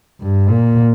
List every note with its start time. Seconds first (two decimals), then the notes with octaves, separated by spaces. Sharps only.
0.21 G2
0.49 A#2